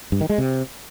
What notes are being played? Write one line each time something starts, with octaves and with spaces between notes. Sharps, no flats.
G2
D#3
G#3
C3